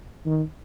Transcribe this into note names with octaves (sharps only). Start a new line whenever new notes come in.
D#3